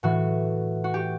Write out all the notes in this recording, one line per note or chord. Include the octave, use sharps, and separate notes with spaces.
A2 E3 F#4
F#4
G4